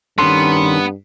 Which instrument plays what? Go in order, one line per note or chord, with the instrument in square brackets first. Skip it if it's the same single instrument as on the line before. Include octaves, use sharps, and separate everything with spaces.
[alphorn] G2 [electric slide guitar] D#3 C#4 A4 [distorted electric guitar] B3 [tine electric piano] C6